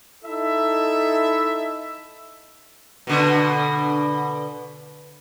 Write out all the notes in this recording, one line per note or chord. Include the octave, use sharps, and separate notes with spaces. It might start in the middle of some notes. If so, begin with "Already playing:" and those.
D#4 E4 A4 E5
B2 D3